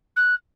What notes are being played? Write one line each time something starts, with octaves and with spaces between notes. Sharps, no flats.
F#6